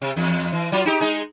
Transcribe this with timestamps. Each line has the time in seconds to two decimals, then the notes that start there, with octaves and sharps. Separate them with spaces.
0.02 C3
0.16 E2
0.53 E3
0.72 F#3 F4
0.85 D#4 G4
1.00 G#3 D#4 G#4